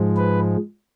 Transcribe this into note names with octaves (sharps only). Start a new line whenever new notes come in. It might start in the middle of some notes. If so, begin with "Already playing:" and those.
Already playing: G#2 F3 G#3
B4